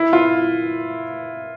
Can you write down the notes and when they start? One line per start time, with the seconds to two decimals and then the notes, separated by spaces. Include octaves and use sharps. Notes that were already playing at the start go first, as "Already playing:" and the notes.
Already playing: E4
0.13 F4